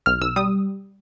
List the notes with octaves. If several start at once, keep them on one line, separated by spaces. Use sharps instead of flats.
B1 F6
B1 E6
G3 D#6